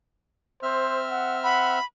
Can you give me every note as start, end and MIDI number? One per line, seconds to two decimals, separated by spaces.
0.63 1.79 60
0.63 1.02 72
0.63 1.79 76
0.63 1.79 89
1.10 1.39 78
1.44 1.79 78
1.44 1.85 83